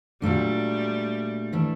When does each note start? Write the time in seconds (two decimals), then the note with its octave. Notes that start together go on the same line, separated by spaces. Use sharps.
0.22 A#2 F#3 G3 A3 D4
1.53 E3 A3 D4